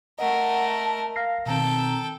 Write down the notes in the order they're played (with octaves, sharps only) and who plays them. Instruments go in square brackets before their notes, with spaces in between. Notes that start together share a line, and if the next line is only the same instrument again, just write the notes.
[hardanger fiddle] A3 A#4 [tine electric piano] D#5 [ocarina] F#5
[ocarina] A5
[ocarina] F5 [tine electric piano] F6 A#6 C7
[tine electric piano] B2 D#3 C4 [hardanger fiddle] A4 G5 [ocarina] A#5